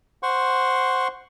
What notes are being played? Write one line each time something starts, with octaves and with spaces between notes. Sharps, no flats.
C5 F#5 C6 C#6